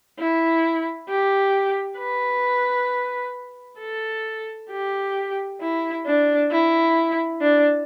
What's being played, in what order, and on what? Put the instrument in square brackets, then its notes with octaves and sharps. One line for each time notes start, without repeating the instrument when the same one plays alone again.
[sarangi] E4
G4
B4
A4
G4
E4
D4
E4
D4